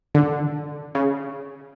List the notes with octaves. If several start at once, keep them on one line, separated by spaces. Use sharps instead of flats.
D3
C#3